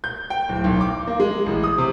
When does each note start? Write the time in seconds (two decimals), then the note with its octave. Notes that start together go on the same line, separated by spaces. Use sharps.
0.04 G6
0.30 G5
0.49 D1
0.64 B1
0.81 D6
1.07 A#3
1.20 G#3
1.46 A1
1.64 D#6
1.78 C3